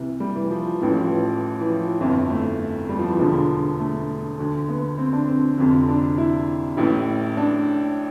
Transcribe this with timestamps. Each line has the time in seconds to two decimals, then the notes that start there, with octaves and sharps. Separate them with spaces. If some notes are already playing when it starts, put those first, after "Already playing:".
Already playing: C2 C3 E3
0.20 G3
0.35 E3
0.50 F3
0.80 A1 A2 E3
0.90 F3
1.00 F3
1.10 E3
1.60 E3
1.70 F3
2.00 G1 F2 E3
2.30 A3
2.89 G3
2.99 F3
3.09 E3
3.19 E1 E2 D3 F3
3.79 A3
4.39 D2 D3
4.69 B3
4.98 C4
5.13 D4
5.28 C4
5.58 F1 F2 D3
5.88 D4
6.18 E4
6.77 A1 A2 E3 E4
7.37 D4